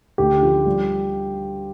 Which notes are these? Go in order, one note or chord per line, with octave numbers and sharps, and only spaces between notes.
D2 G4
F3
G3